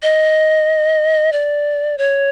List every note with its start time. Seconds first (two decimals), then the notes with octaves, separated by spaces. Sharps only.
0.03 D#5
1.32 D5
1.98 C#5